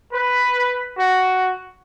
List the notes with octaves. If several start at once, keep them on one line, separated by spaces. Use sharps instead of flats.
B4
F#4